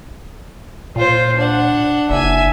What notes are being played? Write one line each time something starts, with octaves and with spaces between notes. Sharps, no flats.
A#2 F4 C5
D4 F#5
F#1 E5 G#5